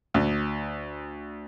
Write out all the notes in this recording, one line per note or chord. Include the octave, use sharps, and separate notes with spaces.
D2